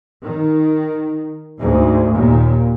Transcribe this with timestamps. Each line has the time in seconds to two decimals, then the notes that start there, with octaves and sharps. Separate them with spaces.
0.23 D#3
1.58 D2 G#2
2.15 D#2 A#2